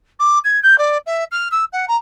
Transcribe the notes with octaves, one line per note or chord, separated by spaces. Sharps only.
D6
G#6
G6
D5
E5
F6
E6
F#5
A#5